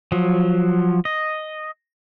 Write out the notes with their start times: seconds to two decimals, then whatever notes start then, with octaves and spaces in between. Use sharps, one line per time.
0.12 F3 F#3
1.05 D#5